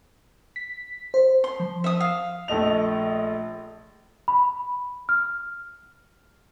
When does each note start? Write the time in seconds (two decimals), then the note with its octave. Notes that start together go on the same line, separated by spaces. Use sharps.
0.56 B6
1.14 C5
1.44 C6
1.60 F3
1.84 E5 D#6
2.00 F5
2.48 A#1 A3 D#5 F7
4.28 B5
5.09 F6